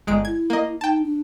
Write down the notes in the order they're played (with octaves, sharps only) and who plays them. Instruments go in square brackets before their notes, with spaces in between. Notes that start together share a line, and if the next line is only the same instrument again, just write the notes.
[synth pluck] G1 G#3 D7
[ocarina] E4 [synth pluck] G#6
[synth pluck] A#3 D#5
[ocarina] D#4 [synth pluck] G5 A5
[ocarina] D4